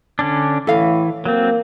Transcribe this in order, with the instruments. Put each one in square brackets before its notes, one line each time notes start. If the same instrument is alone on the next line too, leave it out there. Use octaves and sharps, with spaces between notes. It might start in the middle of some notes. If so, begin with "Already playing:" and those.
[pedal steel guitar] D3 C#4 D4
[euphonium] A2 [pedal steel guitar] E3 [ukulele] A4 F5
[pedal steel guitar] F#3 C4 [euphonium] A#3